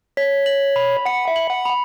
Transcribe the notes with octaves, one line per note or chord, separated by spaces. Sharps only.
C#5 B6
F#7
B5
F#5 C#7
E5
F#7
F#5
B5